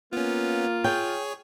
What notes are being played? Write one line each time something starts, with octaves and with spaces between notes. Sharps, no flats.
A#3 B3 C#4 F4
G#4 C#5 G5